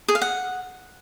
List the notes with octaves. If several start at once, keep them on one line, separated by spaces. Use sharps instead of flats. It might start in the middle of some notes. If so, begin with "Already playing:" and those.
G#4
F5
F#5